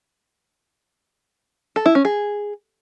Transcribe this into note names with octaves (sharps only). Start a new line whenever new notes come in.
A4
E4
C#4
G#4